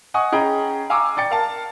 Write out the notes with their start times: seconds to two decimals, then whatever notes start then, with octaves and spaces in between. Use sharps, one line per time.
0.14 D#5 F#5 G#5 C#6 D#6
0.32 C#4 G#4 D#5 G5 A#5 B5
0.90 F5 G#5 A#5 C#6 D6 E6
1.17 D5 G5 A6 C#7
1.31 A#4 F5 A5